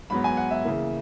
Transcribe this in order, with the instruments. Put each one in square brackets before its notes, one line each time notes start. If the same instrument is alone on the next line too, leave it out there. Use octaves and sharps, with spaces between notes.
[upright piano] G#2 F#3 B3 B5
G#5
F#5
E5
C#3 E3 A#3